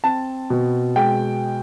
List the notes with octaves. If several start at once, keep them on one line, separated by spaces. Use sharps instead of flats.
C4 A5
B2
G#3 G5